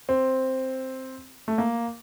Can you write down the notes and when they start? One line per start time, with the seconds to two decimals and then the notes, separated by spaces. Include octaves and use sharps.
0.09 C4
1.48 A3
1.58 A#3